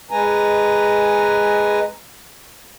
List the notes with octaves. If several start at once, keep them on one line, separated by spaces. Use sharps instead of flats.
G#3 B4 G#5 A#5